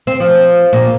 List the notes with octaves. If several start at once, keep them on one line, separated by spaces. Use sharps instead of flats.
C4
F3
A#2